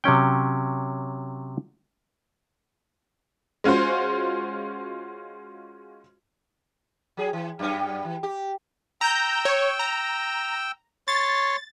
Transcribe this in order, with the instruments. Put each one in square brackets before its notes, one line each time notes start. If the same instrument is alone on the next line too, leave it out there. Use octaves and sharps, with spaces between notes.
[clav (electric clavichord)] C3 F#3 C#4 G5
[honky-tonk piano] G#3 C#4 F4 F#4 C5
[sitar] F#3 G#4
E3
F#2 G3 B3
E3
G4
[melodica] G5 E6 [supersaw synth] A#5 G6
[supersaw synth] C#5
A#5
[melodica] C#5 C6 C#6 [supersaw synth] A6